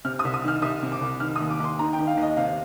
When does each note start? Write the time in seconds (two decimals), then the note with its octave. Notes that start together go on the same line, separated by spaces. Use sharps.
0.05 C3 F6
0.19 D#6
0.24 C2
0.34 D#6
0.44 D#3 F6
0.62 C2 D#6
0.83 C3
0.92 D6
1.01 C2
1.20 D#3 F6
1.36 D#2 D#6
1.50 D6
1.60 D#2 C6
1.79 D#3 A#5
1.93 G5
1.99 D#3
2.07 F5
2.17 D#2
2.22 D#5
2.37 C3 F5